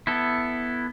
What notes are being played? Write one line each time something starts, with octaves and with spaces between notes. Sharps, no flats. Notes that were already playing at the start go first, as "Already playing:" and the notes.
B3 E4 A4